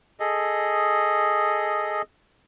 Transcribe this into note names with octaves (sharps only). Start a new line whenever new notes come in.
G#4 A4 D#5